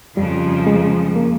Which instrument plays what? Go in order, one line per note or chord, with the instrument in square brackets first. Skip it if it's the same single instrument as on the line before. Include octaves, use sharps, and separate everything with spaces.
[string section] F2 C#3 F3 [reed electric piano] G3
[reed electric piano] G#3
A#3